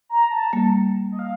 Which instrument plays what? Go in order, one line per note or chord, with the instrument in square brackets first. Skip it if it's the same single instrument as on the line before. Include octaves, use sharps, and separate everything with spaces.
[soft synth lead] A#5
A5
[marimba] G3 A#3
[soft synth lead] D#5
F5